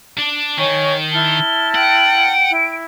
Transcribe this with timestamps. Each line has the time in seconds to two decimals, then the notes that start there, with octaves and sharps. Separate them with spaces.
0.18 D4
0.58 D#3 C#5 G#5 C#6
1.11 E4 A5 F6 G7
1.75 F#5 G5 D7
2.48 E4